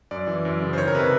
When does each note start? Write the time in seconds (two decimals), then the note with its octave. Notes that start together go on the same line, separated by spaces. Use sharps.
0.11 F#2 D5
0.27 E3
0.45 F#2
0.62 C#3
0.73 C5
0.78 D#3 C#5
0.88 A#4
0.95 C3 B4